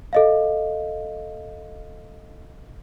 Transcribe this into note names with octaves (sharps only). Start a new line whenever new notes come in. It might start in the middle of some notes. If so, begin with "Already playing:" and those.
A4 D#5 F5